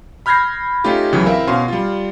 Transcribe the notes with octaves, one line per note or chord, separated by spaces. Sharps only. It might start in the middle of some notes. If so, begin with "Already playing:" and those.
B5 F6 G6 G#6 A#6 C7
A3 C#4 D#4 F4 G4
C#2 C#3 E3 F#3
C4 E4 A#4 E5 F5
B2 C#4 F5 C6
G3 F4